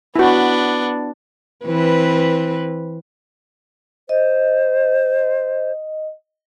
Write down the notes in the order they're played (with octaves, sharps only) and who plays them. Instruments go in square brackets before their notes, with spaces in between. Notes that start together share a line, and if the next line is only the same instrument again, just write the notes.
[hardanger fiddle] B3 D4 [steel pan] E4 F#4
[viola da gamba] E3 C4 B4
[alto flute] C5 [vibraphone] D#5